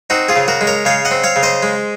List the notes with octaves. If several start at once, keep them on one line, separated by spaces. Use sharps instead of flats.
C4 D#4 F#4
F4 G#4
C#3
F#4 A#4
G#3
A#4 C#5
C#3 C#5 F5
D#5 F#5
C4
C#5 F5
C#3
C5 D#5
G#3